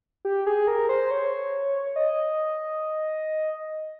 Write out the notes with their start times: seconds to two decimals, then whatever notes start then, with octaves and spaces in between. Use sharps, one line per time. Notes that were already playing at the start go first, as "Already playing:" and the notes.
0.25 G4
0.47 G#4
0.67 A#4
0.89 C5
1.11 C#5
1.96 D#5